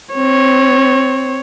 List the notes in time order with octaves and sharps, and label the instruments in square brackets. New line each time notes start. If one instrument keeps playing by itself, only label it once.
[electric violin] C4 C#5